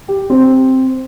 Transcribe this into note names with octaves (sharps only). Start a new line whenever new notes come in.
G4
C4